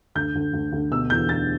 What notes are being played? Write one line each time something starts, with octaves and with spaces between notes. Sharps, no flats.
D2 G6
D2
D2
D2
B2 E6
E2 G6
B2 A6